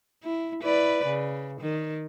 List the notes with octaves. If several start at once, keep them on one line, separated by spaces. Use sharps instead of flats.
E4
E4 B4 D5
C#3
D#3